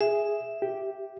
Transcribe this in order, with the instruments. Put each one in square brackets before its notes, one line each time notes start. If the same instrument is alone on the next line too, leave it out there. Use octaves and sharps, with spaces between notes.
[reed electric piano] G#4 [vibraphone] E5
[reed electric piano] G4